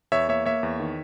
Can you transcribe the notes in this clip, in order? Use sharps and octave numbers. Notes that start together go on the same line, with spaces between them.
E2 C#5 E5
A#3 C#5 E5
A#3 C#5 E5
E2
D#3